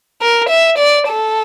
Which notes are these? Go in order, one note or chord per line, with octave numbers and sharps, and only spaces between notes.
A#4
E5
D5
A4